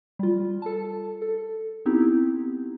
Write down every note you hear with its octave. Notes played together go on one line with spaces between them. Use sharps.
G3 F4
A4 A5
A4
B3 C4 D#4 E4 G4